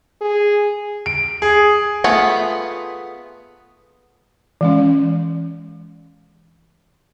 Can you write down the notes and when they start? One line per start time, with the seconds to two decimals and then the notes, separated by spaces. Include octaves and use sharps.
0.21 G#4
1.06 D7
1.42 G#4
2.04 A3 B3 F4 G#4 F#5
4.61 E3 G#3 C#4